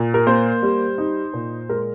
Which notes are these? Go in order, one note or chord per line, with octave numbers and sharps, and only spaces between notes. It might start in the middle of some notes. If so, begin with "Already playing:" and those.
Already playing: A#2
A#4
A#3 C5
G3
D#4
A#2
G#3 A#4